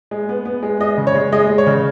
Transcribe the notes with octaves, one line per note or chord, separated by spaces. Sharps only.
G#3
B3
B3
G#3
G#3 D#5
C#3
C#5
G#3
G#3 D#5
G#3
C#5
C#3